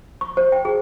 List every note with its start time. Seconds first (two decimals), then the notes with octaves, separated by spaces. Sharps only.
0.21 C#6
0.37 C5
0.52 G5
0.65 G#4